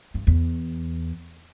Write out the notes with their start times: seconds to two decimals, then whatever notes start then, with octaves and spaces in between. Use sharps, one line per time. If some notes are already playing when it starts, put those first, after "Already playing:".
0.14 G2
0.27 E2